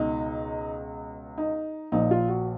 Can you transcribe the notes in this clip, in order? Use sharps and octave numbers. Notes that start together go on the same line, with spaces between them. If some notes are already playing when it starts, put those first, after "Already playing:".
Already playing: C#2 B2 D#4
D#4
A#1 A#2 D#4
F4
F#4